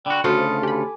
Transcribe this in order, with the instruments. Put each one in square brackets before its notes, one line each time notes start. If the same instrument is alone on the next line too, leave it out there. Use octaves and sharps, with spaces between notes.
[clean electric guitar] D3 F#4 [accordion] D5 G5 B5
[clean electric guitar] D2 C#3 F4 [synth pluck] F#4 C5 [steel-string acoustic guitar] A4 [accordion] B5 D#6
[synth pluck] G4 B5 [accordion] G#5 D6